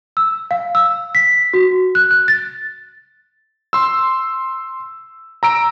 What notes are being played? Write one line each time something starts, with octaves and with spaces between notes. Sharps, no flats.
E6
F5
E6
B6
F#4
F#6
F#6
A6
C6 E6
A#5 E6 D7